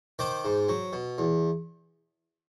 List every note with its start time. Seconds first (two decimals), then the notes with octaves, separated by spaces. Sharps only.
0.19 D#3 C5 D5
0.45 G#2
0.69 F#3
0.93 B2
1.18 E2